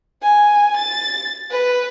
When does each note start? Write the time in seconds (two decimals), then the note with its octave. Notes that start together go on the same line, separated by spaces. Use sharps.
0.22 G#5
0.77 A6
1.51 B4